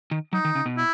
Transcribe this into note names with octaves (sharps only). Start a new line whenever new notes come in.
D#3
F#3 D#4
D#3
C#3
B2
E4